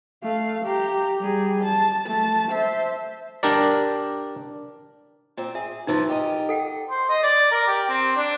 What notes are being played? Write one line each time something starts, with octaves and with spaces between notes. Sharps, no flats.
A3 F5
G4 A#5
G3 G#4
A5
A3 A5
C5 E5
D4 G4 A#4 D5
A#2 C4
G#4 E5
C#3 E3 F3 D#4 F4
G4 A#4 D#5
A4 F#5 G5
C5
D#5
D5
A#4
G4
C4
D4